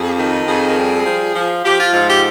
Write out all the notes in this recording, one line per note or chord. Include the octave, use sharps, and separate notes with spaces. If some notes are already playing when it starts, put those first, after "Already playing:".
Already playing: F2 G#4
D#3
F2 G#4
G3
F3
F3
F3 G4
F4
G#2 F4
G4